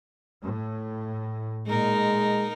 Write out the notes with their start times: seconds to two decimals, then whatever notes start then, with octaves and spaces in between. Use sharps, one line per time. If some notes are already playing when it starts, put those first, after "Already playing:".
0.43 A2
1.67 A#2 G#3 D#4 A#4